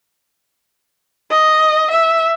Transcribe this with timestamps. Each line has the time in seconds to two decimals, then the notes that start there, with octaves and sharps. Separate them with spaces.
1.31 D#5
1.91 E5